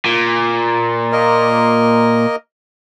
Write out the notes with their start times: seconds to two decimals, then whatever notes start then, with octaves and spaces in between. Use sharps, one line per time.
0.05 A#2
1.12 A#3 A#4 D#5